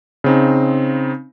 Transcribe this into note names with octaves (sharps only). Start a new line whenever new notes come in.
C#3 C4 D#4